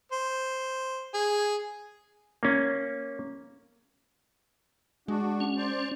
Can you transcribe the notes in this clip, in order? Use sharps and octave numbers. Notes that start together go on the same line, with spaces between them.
C5
G#4
A#3 C#4
G#3 D4 F#4
C#4
C5 D5